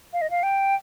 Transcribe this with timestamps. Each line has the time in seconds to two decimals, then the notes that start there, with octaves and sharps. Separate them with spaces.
0.13 F5
0.22 D#5
0.30 F5
0.43 G5